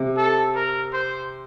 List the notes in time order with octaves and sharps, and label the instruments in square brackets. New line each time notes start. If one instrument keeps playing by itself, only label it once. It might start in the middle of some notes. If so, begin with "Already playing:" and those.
Already playing: [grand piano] C3
[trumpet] A4
A#4
C5